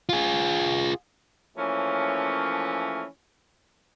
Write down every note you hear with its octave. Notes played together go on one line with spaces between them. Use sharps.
F4 G#4
E3 F3 A3 A#3 C#4